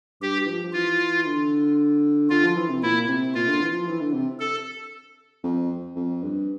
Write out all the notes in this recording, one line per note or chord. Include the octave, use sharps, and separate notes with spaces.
G2 G4
F3
F3
E3 F4
D3
D3 F4
F3
E3
C3
A#2 E4
C3
A#2 F4
D3
E3
F3
E3
D3
C3
A4
F2
F2
G2